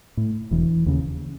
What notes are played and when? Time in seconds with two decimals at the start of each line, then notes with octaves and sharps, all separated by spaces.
0.17 A2
0.51 E1 E3
0.86 D#2 C#3